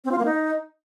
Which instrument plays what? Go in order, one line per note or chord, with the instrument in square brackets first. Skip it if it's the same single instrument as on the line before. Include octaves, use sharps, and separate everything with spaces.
[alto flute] C4
F4
A#3
D#4